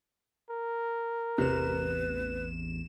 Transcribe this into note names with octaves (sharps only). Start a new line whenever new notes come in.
A#4
A1 E2 C3 B4 E7